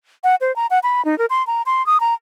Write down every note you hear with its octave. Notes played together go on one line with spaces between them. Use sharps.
F#5
C5
A#5
F#5
B5
D#4
A#4
C6
A#5
C6
D#6
A#5